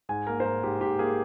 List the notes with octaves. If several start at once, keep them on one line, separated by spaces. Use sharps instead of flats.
G#2 G#5
A#3 A#4
C5
G#2 A#4
G#2 G4
G#2 G4
A#3 G#4